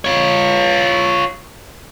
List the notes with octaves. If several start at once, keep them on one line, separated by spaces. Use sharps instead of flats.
F4 C#5